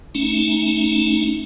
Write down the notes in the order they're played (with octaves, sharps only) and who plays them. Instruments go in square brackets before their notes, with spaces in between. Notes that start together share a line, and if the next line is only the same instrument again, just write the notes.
[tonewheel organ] A3 C#4 D#4